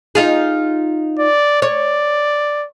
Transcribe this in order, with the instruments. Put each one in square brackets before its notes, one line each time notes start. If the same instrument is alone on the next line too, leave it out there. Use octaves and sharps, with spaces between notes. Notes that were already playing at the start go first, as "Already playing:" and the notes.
[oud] D#4 F4 G#4
[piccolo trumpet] D5
[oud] C#5 [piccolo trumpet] D5